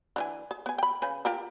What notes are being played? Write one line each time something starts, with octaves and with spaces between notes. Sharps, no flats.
D3 E3 G#5
G#4
B3 G#5
G5 B5
C#3 B4 G#5
F4 G4 A#4